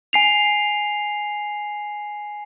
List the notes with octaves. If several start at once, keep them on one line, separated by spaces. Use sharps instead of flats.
G#5 C7 F7